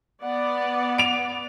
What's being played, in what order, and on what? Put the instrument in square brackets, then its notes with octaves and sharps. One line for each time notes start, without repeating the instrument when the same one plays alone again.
[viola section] B3 D5 [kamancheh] F#5
[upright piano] D7 F7